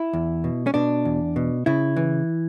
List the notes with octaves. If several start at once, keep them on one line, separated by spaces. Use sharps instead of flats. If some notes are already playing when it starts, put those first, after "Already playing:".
Already playing: E4
E2
B2
C#4
B2 D4
E2
B2
C#3 E4
E3